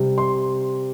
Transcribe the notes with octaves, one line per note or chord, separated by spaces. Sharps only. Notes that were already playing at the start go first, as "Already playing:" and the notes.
Already playing: C3 G3 C4
C6